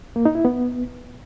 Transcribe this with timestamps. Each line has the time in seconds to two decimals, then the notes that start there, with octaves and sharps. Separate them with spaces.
0.16 A#3
0.25 D#4
0.35 E4
0.45 B3